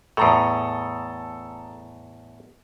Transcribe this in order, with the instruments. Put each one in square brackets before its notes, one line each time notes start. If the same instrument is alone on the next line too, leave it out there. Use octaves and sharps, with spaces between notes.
[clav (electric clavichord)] E2 A2 [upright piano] A4 A#5 D#6